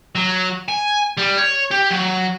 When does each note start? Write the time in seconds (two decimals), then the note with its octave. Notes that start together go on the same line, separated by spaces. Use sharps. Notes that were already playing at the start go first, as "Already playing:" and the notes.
0.16 F#3
0.68 G#5
1.17 G3
1.37 C#5
1.71 G4
1.90 F#3